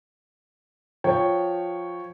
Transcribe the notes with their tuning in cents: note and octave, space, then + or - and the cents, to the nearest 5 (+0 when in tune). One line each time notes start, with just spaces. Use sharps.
F3 +10 C#5 +0 G5 +0